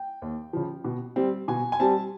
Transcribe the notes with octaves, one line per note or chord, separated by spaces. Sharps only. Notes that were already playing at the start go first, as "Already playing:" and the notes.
Already playing: G5
D#2
C#3 F3
B2
G3 C4
B2 G#5
G#5
G3 C4 A5